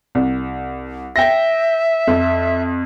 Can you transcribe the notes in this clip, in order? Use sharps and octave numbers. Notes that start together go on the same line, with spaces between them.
C2
E5 G5 A#6
F2